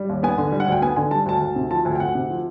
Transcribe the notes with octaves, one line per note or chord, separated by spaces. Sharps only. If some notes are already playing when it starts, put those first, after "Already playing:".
Already playing: G3
D#2
B3 G#5
D3
G3
F#5
D2 G5
B3 G#5
D3 G#5
G3 A5
D2 A5
D2
C3
F3 A5
D2 G#5
G5
D2 F#5
C3
F3